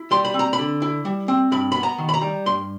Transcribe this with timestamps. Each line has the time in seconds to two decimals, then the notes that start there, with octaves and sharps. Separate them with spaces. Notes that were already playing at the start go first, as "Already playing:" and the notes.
Already playing: E4
0.11 G3 C6
0.25 B5
0.34 C4
0.39 A#5
0.53 B5
0.59 D3
0.82 E4
1.05 G3
1.28 C4
1.52 G2 B5
1.72 B3 B5
1.83 A#5
1.98 D#3
2.09 B5
2.14 A#5
2.21 G3
2.46 G2 C6